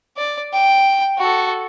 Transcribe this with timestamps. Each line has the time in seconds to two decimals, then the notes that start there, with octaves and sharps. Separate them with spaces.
0.17 D5
0.53 G5
1.18 F#4 A4